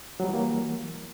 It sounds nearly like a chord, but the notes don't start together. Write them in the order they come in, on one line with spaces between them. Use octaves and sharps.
F#3 G3 E3 A#3